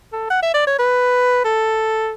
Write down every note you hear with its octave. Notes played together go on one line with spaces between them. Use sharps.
A4
F#5
E5
D5
C#5
B4
A4